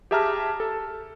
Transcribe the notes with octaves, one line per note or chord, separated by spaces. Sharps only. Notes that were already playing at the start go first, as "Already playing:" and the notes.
G4 G#4 E5 A5 A#5 F6
A4